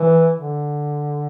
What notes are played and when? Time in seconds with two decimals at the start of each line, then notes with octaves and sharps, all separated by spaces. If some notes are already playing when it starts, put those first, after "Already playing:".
Already playing: E3
0.36 D3